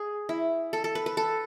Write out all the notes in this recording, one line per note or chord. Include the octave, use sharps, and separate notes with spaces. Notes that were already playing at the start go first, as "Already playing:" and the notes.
Already playing: G#4
E4
A4
A4
B4
B4
A4